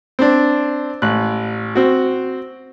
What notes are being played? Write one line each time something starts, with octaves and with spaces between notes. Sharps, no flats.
C4 D4
A1 F#6
C4 F#4